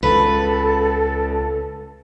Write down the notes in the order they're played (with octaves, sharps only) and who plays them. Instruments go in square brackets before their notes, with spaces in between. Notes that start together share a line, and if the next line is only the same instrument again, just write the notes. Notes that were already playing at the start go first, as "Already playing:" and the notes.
[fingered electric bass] C#2 [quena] A4 [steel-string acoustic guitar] B4